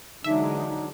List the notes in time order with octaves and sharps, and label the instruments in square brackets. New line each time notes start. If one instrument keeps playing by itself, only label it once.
[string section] D3 E3 G#3 [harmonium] F#3 D4 [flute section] D#4 [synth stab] E5